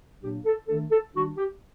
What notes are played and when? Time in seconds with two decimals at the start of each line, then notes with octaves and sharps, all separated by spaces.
0.21 A#2 F#3 A#3 D4 G4
0.45 A4
0.68 D#3 A3 D4 A4
0.91 A4
1.15 D#3 G3 D4 F#4
1.37 G4